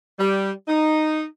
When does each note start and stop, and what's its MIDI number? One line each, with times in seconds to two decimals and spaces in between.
0.19 0.51 55
0.68 1.24 63